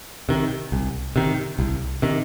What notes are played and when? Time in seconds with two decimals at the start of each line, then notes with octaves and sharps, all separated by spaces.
0.29 C3 D#3
0.72 C2
1.16 C3 D#3
1.59 C2
2.02 C3 D#3